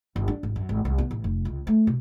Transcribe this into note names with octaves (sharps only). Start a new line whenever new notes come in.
G1
D4
G#1
F#2
G#1
C2
B3
A1
F1
C#2
A3
B2